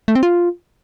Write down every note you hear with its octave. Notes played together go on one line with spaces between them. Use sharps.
A3
C4
F4